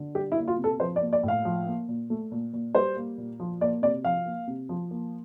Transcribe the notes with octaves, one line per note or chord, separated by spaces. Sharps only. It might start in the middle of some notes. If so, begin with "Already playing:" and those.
Already playing: D3
G3 G4
E4
A#3
F4
C3
A4
F3 C5
D5
A#3
D5
A2
F5
F3
A#3
A#2
A3
A#2
A#2
G3 C5
A#3
A#2
F3
A#3 D5
C3 D5
F3 F5
A#3
C3
F3
A#3